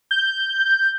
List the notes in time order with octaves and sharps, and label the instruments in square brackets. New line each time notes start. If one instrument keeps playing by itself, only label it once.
[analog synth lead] G6